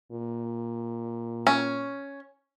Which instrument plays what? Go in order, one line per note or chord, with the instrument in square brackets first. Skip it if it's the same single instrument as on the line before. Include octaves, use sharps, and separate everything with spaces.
[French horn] A#2
[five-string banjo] C#4